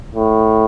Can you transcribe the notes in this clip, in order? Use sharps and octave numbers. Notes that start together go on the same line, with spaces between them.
A2